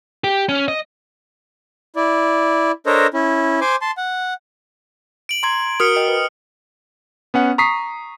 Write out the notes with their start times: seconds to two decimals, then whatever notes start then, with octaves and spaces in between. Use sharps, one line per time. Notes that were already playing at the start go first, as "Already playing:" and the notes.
0.24 G4
0.49 C#4
0.68 D#5
1.96 E4 D5
2.86 D4 A4 A#4 C5 C#5 D#5
3.14 C#4 E4
3.61 C5 G#5 C6 D6
3.81 A5 C6
3.97 F#5
5.29 D7 F#7
5.43 A#5 C6 G#6
5.80 F#4 A#4 D#6 F6 C#7
5.96 D#5 G5
6.08 B4
7.34 B3 C#4 F#5
7.58 A#5 C#6 D#6 B6 C7